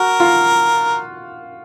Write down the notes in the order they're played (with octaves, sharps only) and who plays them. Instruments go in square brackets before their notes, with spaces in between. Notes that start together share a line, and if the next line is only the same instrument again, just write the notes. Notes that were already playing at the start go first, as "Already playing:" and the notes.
Already playing: [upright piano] F#4 [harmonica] A#4
[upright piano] F4